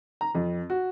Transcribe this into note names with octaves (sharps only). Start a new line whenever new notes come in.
A#5
F2
F#4